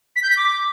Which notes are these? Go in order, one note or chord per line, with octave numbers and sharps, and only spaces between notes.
B6
G6
B6
D6